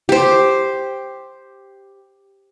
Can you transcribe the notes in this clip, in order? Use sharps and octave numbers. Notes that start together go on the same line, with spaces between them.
G4 C5